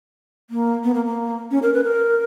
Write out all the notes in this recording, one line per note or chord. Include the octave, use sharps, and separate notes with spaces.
A#3
B3
A#3
A#3
C#4
A#4
B4
A#4